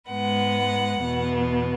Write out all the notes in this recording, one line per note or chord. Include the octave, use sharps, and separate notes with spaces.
G#2 G#3 B3 F#5
E2 B2 B3